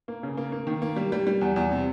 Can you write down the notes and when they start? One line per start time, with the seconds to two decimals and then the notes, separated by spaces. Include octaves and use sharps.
0.08 A#3
0.23 C#3
0.37 A#3
0.52 A#3
0.67 D#3
0.82 A#3
0.96 G3
1.12 G3
1.27 G3
1.41 E2
1.56 E2
1.71 C3